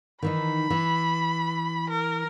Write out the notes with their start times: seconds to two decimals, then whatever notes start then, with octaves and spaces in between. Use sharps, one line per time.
0.22 D#3 E3 D#4 B5
0.70 E3
1.90 A#4